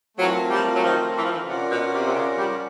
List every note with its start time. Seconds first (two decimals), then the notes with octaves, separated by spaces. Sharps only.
0.17 E3 F#3 A3 C4 F4 A#4
0.50 F3 G3
0.74 F#3
0.83 D#3 F3
1.16 E3
1.24 F3
1.31 D3 E3
1.49 C3 C#4 F4 A#4 D5 F#5
1.71 B2
1.94 C3
2.04 C3
2.15 C#3
2.38 F3 G3